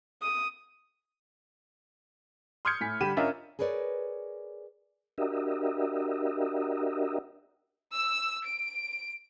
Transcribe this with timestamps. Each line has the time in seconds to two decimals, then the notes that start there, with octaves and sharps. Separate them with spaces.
0.22 D#6
2.65 C6 D#6 F6 G6 G#6 C#7
2.81 A2 G#5 B6
3.01 D3 G3 G4 B5 D#7 E7
3.17 C#4 D4 F4 A#4 D#5 E5
3.59 G#4 A#4 B4 C#5 D5
5.18 D4 F#4 G4 A#4 D#5 E5
7.94 E6
8.46 D7